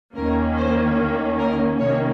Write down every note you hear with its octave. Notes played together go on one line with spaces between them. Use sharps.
D#2 D#3 A#3 C#4 A#4
C5
A#4
C2 C3 D#3 A#3 C#4 C#5